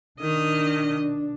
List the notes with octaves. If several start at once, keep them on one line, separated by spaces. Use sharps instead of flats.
D#3 D4 D#5